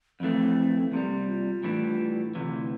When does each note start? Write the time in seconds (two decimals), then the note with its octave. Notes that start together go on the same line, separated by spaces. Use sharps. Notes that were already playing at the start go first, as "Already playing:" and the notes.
0.20 F2 E3 A3 C4
0.91 C2 C3 G3 A#3
1.28 F4
1.64 A2 E3 G3 D4
2.35 D2 C3 E3